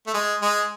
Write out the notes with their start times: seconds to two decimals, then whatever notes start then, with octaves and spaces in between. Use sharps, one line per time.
0.07 A3
0.14 G#3
0.42 G#3